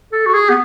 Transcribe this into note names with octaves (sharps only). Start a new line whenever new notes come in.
A4
F#4
G#4
B3